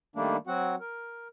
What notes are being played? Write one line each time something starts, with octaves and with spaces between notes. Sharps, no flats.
D#3 G3 A3 A#3 D4
F#3 C4 F#4 F#5
A#4